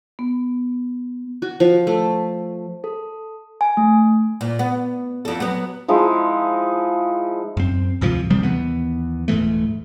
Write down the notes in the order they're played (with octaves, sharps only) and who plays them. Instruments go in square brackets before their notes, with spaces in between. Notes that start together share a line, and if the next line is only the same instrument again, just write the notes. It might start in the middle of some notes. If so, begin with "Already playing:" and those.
[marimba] B3
[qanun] F#4
F3
A3
[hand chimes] A4
G#5
A3
[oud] A#2
B3
F2 A4
F#3 B3
[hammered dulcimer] F3 G#3 D#4 E4
[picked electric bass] F#2 C4
D2 G#2 C3 F3
C3 F3 G3 C4
D#2 E3 B3
D#1 G#2 E3 A3